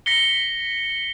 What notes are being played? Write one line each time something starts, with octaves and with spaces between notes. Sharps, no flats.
A#6 B6 C#7 G7